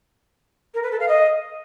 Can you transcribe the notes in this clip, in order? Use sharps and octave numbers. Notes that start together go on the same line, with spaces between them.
A#4
B4
A4
F5
D#5